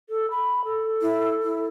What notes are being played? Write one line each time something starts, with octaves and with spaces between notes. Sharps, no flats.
A4
B5
A4
E4
E4